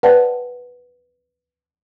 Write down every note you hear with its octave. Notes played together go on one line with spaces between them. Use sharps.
B4 C5 D5 F#5 G5 A5